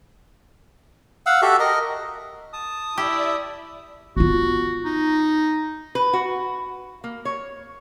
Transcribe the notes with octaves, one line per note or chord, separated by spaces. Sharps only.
F5 F#5 E6
F#4 G4 A4 E5
A#4 D#5
A5 D#6
E4 G4 D5 E5
B3 F4 F#4
D#4
B4
F#4
A#3
C#5